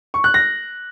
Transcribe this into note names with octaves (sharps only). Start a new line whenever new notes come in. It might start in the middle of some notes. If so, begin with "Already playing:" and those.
C#6
F#6
A#6